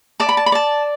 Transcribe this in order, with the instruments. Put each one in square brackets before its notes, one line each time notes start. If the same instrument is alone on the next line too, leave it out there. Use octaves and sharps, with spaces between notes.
[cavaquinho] D5 A5
B5
A5
B5
D5 A5